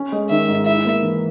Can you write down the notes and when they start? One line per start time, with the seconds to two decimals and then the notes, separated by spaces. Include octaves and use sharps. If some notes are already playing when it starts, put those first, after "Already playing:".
Already playing: C#4
0.12 G#3
0.30 D#3 E5
0.48 G#2
0.66 E4 E5
0.85 A#3
1.03 E3